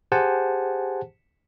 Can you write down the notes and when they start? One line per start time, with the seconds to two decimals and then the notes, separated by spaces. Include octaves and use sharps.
0.12 G4 G#4 C5 F#5 G#5 A5